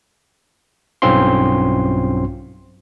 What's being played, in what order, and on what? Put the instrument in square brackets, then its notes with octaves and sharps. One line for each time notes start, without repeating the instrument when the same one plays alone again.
[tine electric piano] B1 G2 C4 C#4 F4 C6